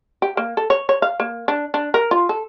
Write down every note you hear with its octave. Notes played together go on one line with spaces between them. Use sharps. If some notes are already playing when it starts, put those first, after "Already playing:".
G4
A#3
A4
C#5
C#5
F5
A#3
D4
D4
A#4
F4
A4